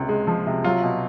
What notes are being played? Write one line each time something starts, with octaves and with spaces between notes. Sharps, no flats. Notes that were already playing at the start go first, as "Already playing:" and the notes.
Already playing: C#2 C3
G#3
F3
C3
F#3 F4
B2